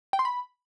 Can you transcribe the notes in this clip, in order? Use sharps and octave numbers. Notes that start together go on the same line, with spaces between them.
G5
C6
B5